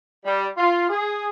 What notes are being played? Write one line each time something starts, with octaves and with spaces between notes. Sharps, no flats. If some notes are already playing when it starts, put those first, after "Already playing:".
G3
F4
G#4